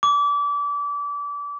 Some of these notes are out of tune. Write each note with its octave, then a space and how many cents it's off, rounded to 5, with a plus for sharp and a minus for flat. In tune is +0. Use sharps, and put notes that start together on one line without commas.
D6 -30